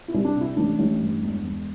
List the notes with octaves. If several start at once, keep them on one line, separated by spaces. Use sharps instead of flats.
E4
C2
D4
C3
E4
A1 D4
A1
G2
E1
E1